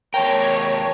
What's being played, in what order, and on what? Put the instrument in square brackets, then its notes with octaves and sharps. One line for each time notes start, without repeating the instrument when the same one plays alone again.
[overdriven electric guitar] E2 A#4 [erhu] C#5 [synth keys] G5 A5